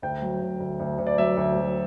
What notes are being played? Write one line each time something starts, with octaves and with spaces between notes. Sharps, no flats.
D2 G5
F#3
D2
D2
D2
D2
D5
F#3 E5
D2
F#3